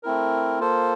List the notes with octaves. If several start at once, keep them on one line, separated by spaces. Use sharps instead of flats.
A3 C4 E4 A#4
A#3 F4 A4 C5